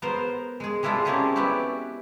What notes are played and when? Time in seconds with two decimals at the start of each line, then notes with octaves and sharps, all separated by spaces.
0.02 B3 A#4 C5
0.60 G#3 G#4
0.83 G3 G#3 E4 F4 A4
1.05 A#3 C4 C#4 E4 G4 G#4
1.35 B3 E4 F#4 G4 D5